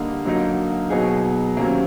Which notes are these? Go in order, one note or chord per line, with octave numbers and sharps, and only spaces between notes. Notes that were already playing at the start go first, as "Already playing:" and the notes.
Already playing: D3 G3 A#3 D#4 G4
D3 F#3 A#3 D#4
B2 F#3 B3 D#4 G#4
C3 D#3 F#3 A#3 C#4